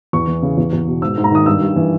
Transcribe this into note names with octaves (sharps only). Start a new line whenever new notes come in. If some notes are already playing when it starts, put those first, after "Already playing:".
E2 C#6
E3
C#3
E2
E2
B2
G#2 E6
G#2
A#5
D#3 D#6
G2 E6
G2
E3